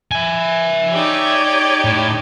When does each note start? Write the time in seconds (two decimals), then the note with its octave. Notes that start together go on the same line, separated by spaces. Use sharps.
0.11 E5 G#5
0.93 D#4 G4 C#5 D5
1.85 A2